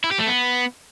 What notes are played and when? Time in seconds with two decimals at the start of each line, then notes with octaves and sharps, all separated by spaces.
0.04 E4
0.12 G4
0.19 A3
0.27 B3